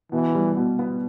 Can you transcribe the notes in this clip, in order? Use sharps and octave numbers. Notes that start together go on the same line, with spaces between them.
B2 E3
G3
B2
B3